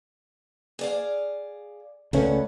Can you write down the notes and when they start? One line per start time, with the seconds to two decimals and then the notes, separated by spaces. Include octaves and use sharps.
0.79 G#4 D5 F5
2.13 C#2 G2 A3 C#4 B4 F#5